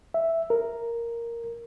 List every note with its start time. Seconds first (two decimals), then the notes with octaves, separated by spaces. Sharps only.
0.14 E5
0.50 A#4